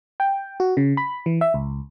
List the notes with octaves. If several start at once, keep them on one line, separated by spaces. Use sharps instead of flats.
G5
F#4
C#3
B5
E3
E5
C#2